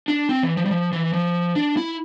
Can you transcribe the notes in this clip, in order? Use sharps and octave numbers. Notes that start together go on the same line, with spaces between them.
D4
C4
E3
F3
G3
F3
E3
F3
D4
E4